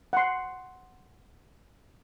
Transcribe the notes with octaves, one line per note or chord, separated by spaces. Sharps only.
F#5 C6